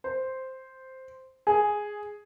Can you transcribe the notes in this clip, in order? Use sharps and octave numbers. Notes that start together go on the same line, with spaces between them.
C5
G#4